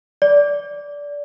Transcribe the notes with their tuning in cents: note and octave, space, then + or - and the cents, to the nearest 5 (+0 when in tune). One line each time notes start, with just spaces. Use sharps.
D5 -15